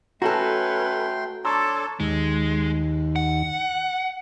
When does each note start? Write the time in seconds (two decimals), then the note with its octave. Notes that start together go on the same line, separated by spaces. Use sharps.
0.22 A3 C#4 F#4 A4 B4 G5 A#5 C6
1.45 D4 A4 C#5 A#5 C6 D6 E6
2.00 D#2 G#3
3.16 F#5